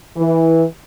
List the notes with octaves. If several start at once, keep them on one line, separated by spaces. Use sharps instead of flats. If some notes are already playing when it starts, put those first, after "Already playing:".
E3